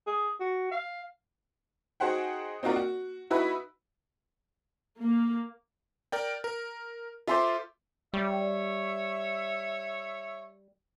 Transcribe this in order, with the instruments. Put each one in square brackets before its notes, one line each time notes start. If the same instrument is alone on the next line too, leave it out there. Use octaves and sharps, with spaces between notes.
[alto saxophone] G#4
F#4
F5
[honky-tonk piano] D#4 F#4 G#4 C5 F#5 G5
C4 D#4 F4 F#4 A#4 D5
F#4
D#4 E4 F#4 B4 B5
[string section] A#3
[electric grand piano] A#4 D5 G5
A#4
[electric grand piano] F4 A4 C5 [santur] E5 C6 D6
[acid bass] G3 [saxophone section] C#5 E5